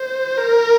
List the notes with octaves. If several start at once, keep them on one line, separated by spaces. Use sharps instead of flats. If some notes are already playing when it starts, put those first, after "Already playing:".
Already playing: C5
A#4